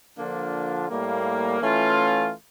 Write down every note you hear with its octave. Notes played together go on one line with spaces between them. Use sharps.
D3 F3 A#3 D4 F4
A2 G3 A#3
E3 A3 C#4 F4